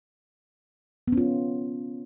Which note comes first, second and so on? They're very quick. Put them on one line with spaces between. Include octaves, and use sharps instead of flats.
B3 C#4 F4